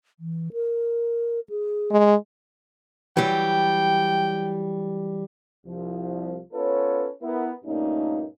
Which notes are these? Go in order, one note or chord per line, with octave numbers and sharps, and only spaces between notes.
E3
A#4
G#4
G#3
E3 F#3 G3 G5
C2 F3
B3 C#4 F4 A4 B4 C#5
B3 E4 A#4
G2 A#2 A3 A#3 C#4 D#4